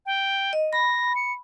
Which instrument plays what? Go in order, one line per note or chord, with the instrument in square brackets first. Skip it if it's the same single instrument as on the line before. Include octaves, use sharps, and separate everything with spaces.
[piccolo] G5
[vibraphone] D#5
[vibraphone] B5 [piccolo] A#6
[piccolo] C#7